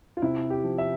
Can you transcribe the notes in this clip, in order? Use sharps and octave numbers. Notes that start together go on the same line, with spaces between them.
F4
C3 E4
G4
F3
E5